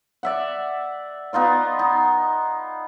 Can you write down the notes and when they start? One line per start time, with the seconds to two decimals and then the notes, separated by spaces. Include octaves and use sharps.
0.23 D5 E5 F#5
1.33 B3 D#4 F4 D5
1.79 D#4